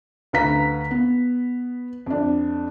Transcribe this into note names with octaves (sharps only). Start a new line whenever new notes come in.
D2 B4 F5 A#5 B6
B3
F2 D4